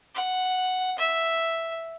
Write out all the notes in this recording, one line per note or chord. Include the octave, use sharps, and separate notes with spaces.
F#5
E5